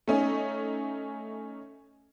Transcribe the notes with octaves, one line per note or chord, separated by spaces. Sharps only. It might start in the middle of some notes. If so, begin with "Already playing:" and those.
A3 C#4 D#4